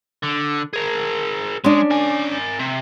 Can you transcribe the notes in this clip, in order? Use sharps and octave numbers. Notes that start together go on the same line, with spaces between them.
D3
G#4 A#4
G#3 C#4 D4
A#4 G#5
C3